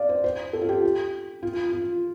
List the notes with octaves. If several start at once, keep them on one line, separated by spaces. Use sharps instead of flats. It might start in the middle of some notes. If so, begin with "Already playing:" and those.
Already playing: D5 F5
C5
C5
A4
F4
G4
F4
F4
F4